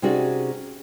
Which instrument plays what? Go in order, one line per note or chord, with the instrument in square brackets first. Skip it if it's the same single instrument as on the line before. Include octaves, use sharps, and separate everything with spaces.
[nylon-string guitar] C3 C#4 D#4 F#4 G#4 D5